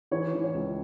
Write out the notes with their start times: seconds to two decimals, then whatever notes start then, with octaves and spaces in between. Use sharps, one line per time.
0.11 E3 C#5
0.33 E3
0.44 C#5
0.54 C#2